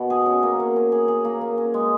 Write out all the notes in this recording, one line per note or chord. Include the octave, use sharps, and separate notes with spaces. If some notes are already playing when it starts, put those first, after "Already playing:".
Already playing: B2
G#4
C#4
A#3
C#4
C#4
G#4
G#4
A#3
A#3
C#4
G#3